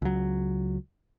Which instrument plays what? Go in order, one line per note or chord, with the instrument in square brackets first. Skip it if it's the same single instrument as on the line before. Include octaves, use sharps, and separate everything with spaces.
[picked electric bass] C#2 F#3